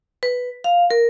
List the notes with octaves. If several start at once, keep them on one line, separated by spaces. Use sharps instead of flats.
B4
F5
A#4